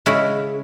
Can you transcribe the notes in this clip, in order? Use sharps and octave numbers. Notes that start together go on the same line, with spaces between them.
C#3 G#3 C#4 E4